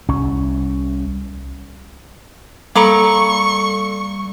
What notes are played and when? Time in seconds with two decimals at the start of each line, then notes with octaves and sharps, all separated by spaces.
0.09 C2 C#4
2.76 G3 A#3 A4 A#5 B5 C#6 D6 C#7